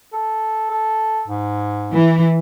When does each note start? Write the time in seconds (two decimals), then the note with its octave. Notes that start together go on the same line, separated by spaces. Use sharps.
0.13 A4
0.70 A4
1.28 G#2
1.91 E3